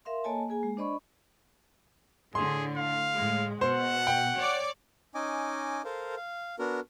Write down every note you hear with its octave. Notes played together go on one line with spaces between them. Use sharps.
A#4 E5 F5 C6
A#3 A4 C#5 D#5 G#5 A5
A#3 G#4 G#5
G#3
D4 C5 D5 D#5 B5 C#6
A2 D3 G#4 C6
F5
A2 G#3
B2 C5 F#5
G5
C#5 D5 D6
C#4 D#4 D#5 G#5 D6
A4 A#4 C5 F5
F5
B3 D4 F#4 A#4